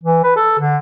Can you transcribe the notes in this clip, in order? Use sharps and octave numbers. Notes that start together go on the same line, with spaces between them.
E3
B4
A4
D3